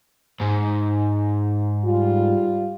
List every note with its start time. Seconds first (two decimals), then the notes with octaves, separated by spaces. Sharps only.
0.40 G#2
1.85 G3 F4